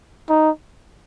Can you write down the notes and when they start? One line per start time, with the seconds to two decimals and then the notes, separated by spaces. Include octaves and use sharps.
0.29 D#4